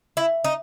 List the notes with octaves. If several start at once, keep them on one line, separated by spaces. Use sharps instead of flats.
E4
D#4